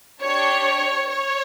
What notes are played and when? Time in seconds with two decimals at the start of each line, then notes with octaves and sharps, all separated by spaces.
0.22 D4 G4 C#5
1.08 C#5